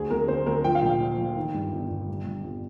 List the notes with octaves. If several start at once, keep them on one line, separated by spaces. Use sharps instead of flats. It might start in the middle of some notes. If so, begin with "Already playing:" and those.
Already playing: D2 G#4
D2 A#4
D2 C5
D2 A#4
F3 G5
F5
A#1 G5
A#2
F3
D#3
G2
G1
G1
G2
G2
G1